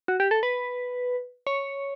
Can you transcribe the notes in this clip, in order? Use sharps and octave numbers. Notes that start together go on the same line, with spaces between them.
F#4
G4
A4
B4
C#5